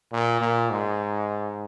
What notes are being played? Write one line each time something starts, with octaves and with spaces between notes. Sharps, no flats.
A#2
A#2
G#2